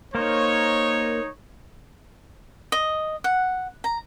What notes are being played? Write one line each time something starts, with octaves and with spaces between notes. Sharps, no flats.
A#3 D#4 A#4 C5 C#5
D#5
F#5
A#5